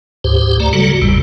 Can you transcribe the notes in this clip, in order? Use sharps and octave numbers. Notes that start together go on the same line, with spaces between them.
D2 G#2 G4 C5
A3 D5 A#5
C#3 F#3 G3 F#4 A4
G#1 E2 A2 C3 G3